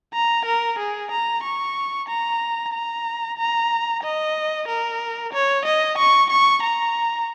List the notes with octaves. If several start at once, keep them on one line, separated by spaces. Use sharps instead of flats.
A#5
A#4
G#4
A#5
C#6
A#5
A#5
A#5
D#5
A#4
C#5
D#5
C#6
C#6
A#5